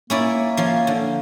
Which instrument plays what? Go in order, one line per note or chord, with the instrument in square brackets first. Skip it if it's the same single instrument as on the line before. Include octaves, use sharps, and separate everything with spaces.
[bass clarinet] A#3 [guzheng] C#4 E4 D5
[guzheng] F3 C#4
D3